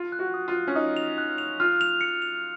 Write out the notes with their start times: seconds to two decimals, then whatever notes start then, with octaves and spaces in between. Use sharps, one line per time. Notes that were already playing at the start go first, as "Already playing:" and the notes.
Already playing: F4
0.12 F#6
0.19 F#4
0.34 D#6
0.48 F4
0.55 F#6
0.68 C#4
0.75 D#4 D#6
0.97 F7
1.18 F#6
1.38 F7
1.60 F4 F6
1.81 F7
2.01 C#7
2.22 F7